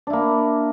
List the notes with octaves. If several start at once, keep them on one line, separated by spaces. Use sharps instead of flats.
A#3 D4 E4